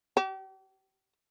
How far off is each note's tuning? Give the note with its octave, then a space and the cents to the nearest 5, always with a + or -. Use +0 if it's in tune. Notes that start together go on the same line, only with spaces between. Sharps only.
G4 -40